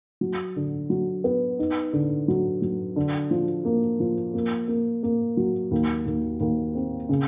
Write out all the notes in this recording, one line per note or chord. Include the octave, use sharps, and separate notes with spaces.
F#3
D3
F#3
B3
D#4
D3
F#3
F#3
D3
F3
A#3
F3
A#3
A#3
A#3
F#3
D#2
D#2
D#2
C4
C#3